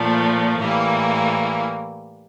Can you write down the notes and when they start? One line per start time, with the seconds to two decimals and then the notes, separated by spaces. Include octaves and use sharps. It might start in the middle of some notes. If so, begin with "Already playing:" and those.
Already playing: A#2 F3 A3
0.59 A2 E3 G3 A#3